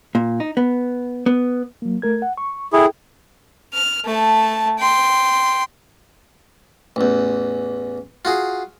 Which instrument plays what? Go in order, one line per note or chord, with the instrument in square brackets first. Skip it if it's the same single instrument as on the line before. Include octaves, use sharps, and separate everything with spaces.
[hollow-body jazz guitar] A#2
D#4
B3
B3
[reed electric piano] F#3 A#3
A3 A#4 G#6
F#5
C#6
[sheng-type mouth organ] E4 G#4 [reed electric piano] A4 G5
[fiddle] F6
A3 A5
G5 C6
[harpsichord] A1 E2
F4 F#4 G#4